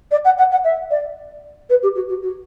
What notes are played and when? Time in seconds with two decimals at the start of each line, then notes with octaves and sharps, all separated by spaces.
0.11 D5
0.24 F#5
0.38 F#5
0.51 F#5
0.64 E5
0.90 D5
1.69 B4
1.82 G4
1.95 F#4
2.09 F#4
2.22 F#4